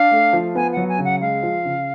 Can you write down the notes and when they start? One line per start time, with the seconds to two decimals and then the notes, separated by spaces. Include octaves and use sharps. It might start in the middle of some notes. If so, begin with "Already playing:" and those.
Already playing: D4 F5
0.11 A3
0.33 F3
0.55 B3 G#5
0.72 F#3 F#5
0.88 G#5
0.99 C#3
1.04 F#5
1.21 G#3 F5
1.43 F3
1.65 C#3